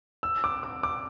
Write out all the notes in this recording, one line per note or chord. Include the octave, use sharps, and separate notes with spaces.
E6
D6
D6
D6